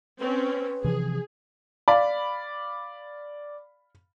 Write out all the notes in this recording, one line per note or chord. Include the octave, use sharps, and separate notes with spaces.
C4 C#4 B4
C3 E3 F3 G#4
D5 F5 B5